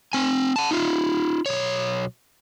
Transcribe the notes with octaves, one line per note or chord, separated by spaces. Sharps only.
C4 G#5
F#5 A5
D#4 F4
B1 C#5